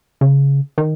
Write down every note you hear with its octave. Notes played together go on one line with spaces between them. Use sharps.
C#3
D#3